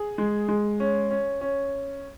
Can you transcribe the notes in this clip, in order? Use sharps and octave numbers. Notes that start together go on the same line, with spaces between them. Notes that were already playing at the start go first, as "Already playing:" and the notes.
Already playing: G#4
G#3
G#3
C#4
C#4
C#4